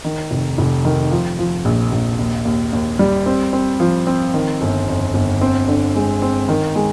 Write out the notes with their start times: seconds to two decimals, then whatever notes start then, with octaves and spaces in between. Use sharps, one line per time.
0.04 D#3
0.31 F1
0.58 F1
0.85 D#3
1.11 F3
1.39 F3
1.65 A#1
1.92 A#1
2.19 D#2
2.45 D#2
2.73 D#2
2.99 G3
3.26 C4
3.53 C4
3.80 F3
4.07 C4
4.34 D#3
4.61 G1
4.87 F2
5.14 G1
5.41 C4
5.68 D3
5.95 G#3
6.22 C4
6.49 D#3
6.75 G#3